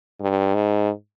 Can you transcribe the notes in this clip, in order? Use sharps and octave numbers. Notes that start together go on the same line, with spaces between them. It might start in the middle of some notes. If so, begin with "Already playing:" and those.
G2
G#2